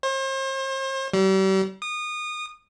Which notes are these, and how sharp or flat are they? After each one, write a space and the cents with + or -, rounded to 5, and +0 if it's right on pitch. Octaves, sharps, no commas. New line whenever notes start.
C5 +40
G3 -40
D#6 -25